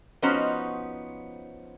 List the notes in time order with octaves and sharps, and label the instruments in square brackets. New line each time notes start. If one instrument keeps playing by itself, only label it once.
[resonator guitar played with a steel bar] F3 B3 C#4 D#4 F#4 C5